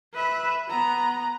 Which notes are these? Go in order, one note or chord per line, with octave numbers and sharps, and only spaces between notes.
B4 E5
B3 A#5